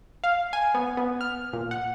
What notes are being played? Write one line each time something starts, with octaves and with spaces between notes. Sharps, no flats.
F5
G#5
B3
B3
F6
A#2
F#5